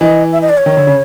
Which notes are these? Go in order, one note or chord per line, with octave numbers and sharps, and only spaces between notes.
E3 D#5
E5
D#5
D5
C#5
D#3
D3
C#3